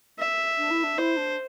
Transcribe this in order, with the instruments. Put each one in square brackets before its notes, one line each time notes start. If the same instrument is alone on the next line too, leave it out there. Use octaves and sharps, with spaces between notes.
[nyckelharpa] E5
[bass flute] D4
E4
D4
[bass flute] E4 [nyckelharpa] C5
[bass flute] D4